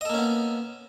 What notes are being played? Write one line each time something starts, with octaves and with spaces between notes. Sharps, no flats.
A#3 B3 C#4 A4 D#5